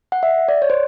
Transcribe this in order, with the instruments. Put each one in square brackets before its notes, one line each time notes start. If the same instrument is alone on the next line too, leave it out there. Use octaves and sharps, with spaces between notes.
[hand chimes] F#5
E5
D5
C#5
C5